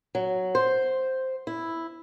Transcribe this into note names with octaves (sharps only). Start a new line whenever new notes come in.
F#3
C5
E4